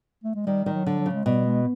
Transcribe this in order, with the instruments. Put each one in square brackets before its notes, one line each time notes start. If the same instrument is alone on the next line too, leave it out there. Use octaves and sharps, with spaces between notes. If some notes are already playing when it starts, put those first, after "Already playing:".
[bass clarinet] A3
G#3
[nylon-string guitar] D#3 [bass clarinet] G3
[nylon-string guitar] D#3 [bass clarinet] G3
[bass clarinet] F#3
[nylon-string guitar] D3
[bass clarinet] F#3
[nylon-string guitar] C#3
[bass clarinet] G#3
[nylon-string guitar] B2 [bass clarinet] G3
[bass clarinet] G#3